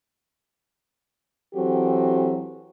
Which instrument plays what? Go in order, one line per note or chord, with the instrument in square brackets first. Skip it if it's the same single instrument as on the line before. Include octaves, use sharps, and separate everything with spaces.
[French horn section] E3 F#3 C4 F#4 G4 A4